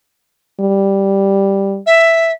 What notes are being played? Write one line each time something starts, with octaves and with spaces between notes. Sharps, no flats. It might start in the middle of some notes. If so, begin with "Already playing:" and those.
G3
E5